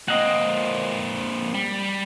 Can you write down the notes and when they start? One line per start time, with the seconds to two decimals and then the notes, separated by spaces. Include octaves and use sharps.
0.08 A#3 C4 D#5 F#5
1.54 G3